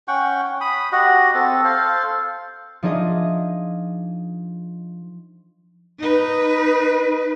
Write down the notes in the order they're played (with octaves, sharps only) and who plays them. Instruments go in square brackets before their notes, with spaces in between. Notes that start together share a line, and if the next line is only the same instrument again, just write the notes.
[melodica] C#4 F#5 G5 C#6
B5 D#6
F#4 G4 D#5 F#5
C4 A4
A4 C5 F5
[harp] F3 D4 D#4 G#4 D#5
[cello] D#4 B4